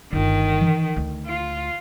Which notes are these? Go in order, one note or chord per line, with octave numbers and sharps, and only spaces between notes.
G1 D#3 F4
E3
D2
F4